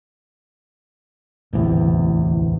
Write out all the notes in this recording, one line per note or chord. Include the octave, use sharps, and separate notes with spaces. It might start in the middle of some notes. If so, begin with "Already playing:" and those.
D1 A1 E2 C3